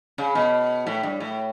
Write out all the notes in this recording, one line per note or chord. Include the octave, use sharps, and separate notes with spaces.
C#3
B2
A2
G2
A2